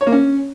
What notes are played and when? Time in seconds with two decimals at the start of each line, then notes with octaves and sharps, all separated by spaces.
0.01 C#5
0.07 A#3
0.12 C#4